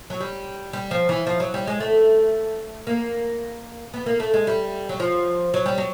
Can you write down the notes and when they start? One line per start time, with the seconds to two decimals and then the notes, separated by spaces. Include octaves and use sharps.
0.10 F#3
0.20 G3
0.73 G3
0.91 F3
1.09 E3
1.27 F3
1.40 F#3
1.54 G3
1.67 G#3
1.80 A3
2.87 A#3
3.94 B3
4.06 A#3
4.20 A3
4.34 G#3
4.47 G3
4.89 F#3
5.00 F3
5.54 F#3
5.66 G3
5.78 F#3